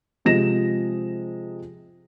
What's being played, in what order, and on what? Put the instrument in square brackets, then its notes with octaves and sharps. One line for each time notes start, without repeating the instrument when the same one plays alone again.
[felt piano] C3 F3 G#3 D#5 A#6 E7